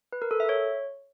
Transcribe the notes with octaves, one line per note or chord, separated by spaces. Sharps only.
B4
A#4
A4
E5
C#5